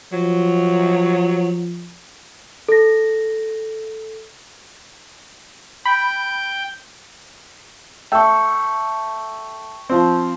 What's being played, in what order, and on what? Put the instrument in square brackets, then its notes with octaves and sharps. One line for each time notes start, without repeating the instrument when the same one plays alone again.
[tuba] F3 [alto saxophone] F#3
[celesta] A4 A#6
[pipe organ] G5 [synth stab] B5
[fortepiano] A3 E6 [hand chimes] G5 C#6
[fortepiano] F3 C4